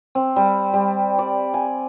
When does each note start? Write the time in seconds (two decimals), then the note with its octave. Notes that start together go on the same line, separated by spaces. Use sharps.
0.15 C4
0.36 G3
0.73 G3
1.19 D5
1.54 G#5